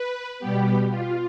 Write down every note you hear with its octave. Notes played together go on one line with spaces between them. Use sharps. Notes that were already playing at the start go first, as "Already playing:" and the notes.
Already playing: B4
B2 G3 B3 G4
F4